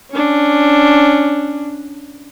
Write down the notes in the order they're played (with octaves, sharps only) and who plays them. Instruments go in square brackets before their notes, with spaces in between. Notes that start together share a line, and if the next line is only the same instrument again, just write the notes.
[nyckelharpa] C#4 D4